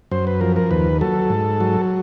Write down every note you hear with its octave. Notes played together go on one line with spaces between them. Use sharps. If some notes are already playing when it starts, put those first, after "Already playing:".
F#2 C5
B4
F3 A#4
A#4
D#2 B4
F#3 A4
G#2
F#3